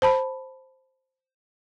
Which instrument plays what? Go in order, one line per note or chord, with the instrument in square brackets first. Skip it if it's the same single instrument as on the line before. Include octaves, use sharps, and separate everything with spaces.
[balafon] C5 A5 B5